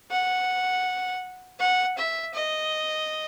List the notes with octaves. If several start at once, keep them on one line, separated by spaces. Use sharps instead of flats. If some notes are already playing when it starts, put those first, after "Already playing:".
F#5
F#5
E5
D#5